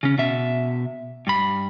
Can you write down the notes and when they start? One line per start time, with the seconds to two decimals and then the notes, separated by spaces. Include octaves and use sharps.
0.03 C#3 C#4
0.18 B2 E5
1.27 G2 B5